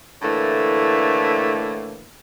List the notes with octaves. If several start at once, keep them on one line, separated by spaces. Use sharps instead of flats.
A2 D3 E3 A3 A#3